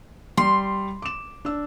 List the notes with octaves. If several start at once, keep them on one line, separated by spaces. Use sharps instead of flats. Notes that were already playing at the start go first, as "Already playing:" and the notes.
G3 C6
D6 E7
D4 E6